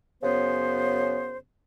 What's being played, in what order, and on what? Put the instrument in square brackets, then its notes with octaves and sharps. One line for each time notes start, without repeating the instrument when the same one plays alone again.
[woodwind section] F#2 C#3 B3 C5